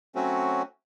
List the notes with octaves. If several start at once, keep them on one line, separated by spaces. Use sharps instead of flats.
F#3 A3 C4 C#4 F#4